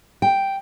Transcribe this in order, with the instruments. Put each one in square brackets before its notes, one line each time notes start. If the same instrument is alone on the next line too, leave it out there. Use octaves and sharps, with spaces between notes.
[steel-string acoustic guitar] G5